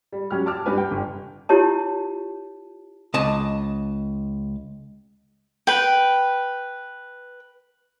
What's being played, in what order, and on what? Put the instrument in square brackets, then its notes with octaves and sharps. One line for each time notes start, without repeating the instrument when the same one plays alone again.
[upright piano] G3
F#3 C#4 G4 F6
A5 D6 F6
G2 G4 B4 G#5
G5
G1
[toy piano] E4 F4 G4 C#5 A5
[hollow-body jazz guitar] C#2 D#5 A5
[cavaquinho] B4 G5